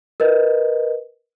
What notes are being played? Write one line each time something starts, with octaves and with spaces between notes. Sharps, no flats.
A#4 B4 D#5